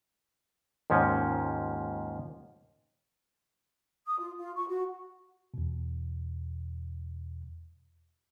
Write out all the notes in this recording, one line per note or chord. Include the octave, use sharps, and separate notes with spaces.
D#2 G#2 F3 C#4
D#6
F4
F4
C#6
F#4
E2 B2